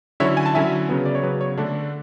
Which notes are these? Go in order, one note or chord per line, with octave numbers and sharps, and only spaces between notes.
D3 F#3 C#4 E4 C#5 E5
G#5
A5
D3 F#3 C#4 E4 E5 G#5
C#3 F#3 B3
D5
C#5
C#3 F#3 B3 B4
C#5
D3 A3 D4